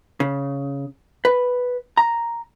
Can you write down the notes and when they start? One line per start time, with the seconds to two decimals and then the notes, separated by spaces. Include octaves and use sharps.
0.20 C#3
1.25 B4
1.97 A#5